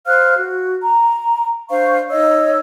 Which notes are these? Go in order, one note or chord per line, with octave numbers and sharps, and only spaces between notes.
C5 F5 F6 F#6
F#4
A#5
D4 C5 F5 C#6
D#4 C#5 D#5 E6